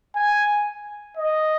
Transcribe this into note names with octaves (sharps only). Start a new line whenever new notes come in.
G#5
D#5